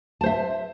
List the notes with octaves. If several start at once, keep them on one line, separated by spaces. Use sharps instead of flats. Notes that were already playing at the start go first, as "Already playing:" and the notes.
C5 E5 A5